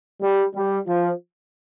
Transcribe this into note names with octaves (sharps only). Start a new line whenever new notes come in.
G3
G3
F3